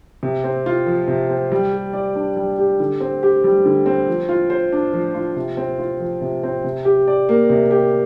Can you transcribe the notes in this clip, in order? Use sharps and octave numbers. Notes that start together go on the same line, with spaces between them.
C3
C4
F4
F3
C3
C4
G3
G4
D5
D4
G3
G4
D3
C4
G4
G3
D3
C4
F3
F4
C5
D4
F3
F4
C3
C4
F4
F3
C3
C4
C3
G4
D5
A#3
C3
G4